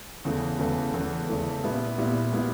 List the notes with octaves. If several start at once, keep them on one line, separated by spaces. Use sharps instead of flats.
E2 C#3 E3 A3
E2 C#3 E3 A3
E2 C#3 E3 A3
E2 C#3 E3 A3
A#2 G3 B3 E4
A#2 G3 B3 E4
A#2 G3 B3 E4